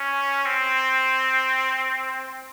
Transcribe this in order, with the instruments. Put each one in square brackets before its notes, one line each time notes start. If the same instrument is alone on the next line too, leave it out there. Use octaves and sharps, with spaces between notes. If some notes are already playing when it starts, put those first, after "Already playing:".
Already playing: [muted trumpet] C#4
C4